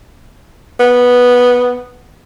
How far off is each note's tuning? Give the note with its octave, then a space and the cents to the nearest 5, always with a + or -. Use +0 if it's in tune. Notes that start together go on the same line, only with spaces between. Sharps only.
B3 -5